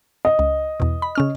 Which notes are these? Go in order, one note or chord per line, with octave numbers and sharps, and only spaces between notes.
D#5
C#2
E2 B2
B5
C#3 C#4 F6